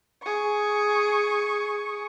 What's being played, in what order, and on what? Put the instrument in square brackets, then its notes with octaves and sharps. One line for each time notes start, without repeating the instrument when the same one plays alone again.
[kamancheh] G#4 C#6